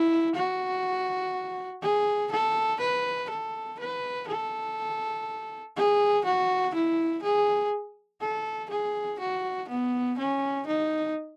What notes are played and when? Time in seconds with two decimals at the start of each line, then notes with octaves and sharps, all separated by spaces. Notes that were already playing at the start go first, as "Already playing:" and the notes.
Already playing: E4
0.35 F#4
1.82 G#4
2.32 A4
2.80 B4
3.30 A4
3.79 B4
4.28 A4
5.76 G#4
6.25 F#4
6.75 E4
7.23 G#4
8.21 A4
8.70 G#4
9.20 F#4
9.69 B3
10.18 C#4
10.67 D#4